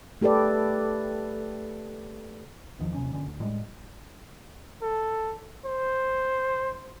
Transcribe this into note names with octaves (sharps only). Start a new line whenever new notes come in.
A3 G4 A4 B4 D5
B1 E2 D#3 F3
D#2 C3 F#3 C#4
A#1 G2 D3 C#4
D2
A2 G3 G#3
A4
C5